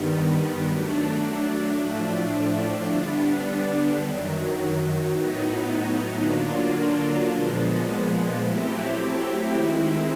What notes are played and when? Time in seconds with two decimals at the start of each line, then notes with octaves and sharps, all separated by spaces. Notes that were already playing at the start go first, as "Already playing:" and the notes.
Already playing: G2 D#3 G3 B3
0.63 F#3 A3 D4
1.74 A2 F3 A3 D4
2.84 D3 G3 B3 D4
3.96 F#2 D#3 F#3
5.06 A2 F#3 B3 D#4
6.18 D3 F#3 A#3 D4 F4
7.28 A#2 F3 G#3 B3
8.40 F#3 A3 C4 E4 G4
9.51 D#3 G#3 C4 E4